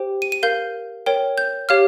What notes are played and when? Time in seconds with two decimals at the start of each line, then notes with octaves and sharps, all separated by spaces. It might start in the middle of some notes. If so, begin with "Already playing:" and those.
Already playing: G4 C5 G5
0.22 D#7
0.32 D#7
0.43 A#4 F5 G6
1.06 A#4 C#5 G5
1.38 G6
1.69 G4 C#5 F5 F6